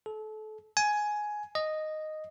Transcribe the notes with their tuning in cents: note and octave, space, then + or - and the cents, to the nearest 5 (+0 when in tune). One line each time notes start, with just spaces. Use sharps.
A4 -30
G#5 +10
D#5 -5